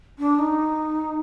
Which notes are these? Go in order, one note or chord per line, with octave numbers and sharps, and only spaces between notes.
D4
D#4